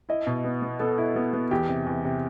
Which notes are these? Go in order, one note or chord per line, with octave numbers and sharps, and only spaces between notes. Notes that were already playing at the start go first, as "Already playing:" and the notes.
E4 D#5
B2
B3
B3
B3 A4
E4
B3
B3
E2 G4
C3
E2
C3